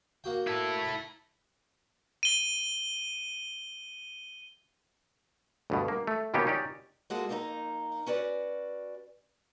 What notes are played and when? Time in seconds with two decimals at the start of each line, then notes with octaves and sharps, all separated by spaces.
0.24 A#3 F#4 G5
0.47 E4 A4
0.85 A#5 B5
2.23 D#7 G7
5.70 D2 G2 B2
5.88 A#3
6.07 A3
6.34 B2 D#3 A#3 B3 C#4 G4
6.47 C#4 D#4 G4 D5
7.10 G#3 A#3 F4 F#4 A4
7.29 F2 A#3 D#4 G4 A#5
8.06 C#4 F#4 B4 D5